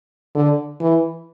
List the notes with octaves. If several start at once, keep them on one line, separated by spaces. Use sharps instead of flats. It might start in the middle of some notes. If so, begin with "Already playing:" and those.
D3
E3